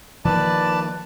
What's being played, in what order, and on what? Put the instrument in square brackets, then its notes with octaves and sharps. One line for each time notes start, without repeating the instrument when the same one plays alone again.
[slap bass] D#3 F3 A#3 [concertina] B4 D5 A5